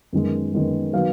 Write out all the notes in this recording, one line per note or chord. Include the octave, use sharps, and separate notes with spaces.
F#2 D#3 G#3 B3
F#2 D#3 G#3 B3
D#3 F#3 B3 F5